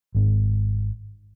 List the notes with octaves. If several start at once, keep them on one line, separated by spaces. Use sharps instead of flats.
G#1 G#2